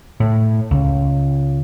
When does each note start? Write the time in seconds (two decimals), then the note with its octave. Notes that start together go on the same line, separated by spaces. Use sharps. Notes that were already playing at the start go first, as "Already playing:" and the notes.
0.20 A2
0.71 C#2